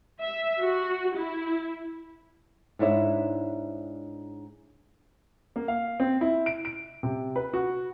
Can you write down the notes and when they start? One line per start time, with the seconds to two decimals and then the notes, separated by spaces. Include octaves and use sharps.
0.21 E5
0.61 F#4
1.16 E4
2.79 G#2 D4 E4 C#5 E5
5.56 A#3
5.68 F5
6.00 C4
6.21 E4
6.46 D7
6.65 D7
7.03 C3
7.36 B4
7.54 F#4